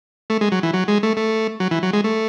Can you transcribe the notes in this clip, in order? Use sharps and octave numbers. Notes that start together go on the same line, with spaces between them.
A3
G#3
F#3
E3
F#3
G#3
A3
A3
F#3
E3
F#3
G#3
A3